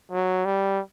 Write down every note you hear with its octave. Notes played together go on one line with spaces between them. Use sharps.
F#3
G3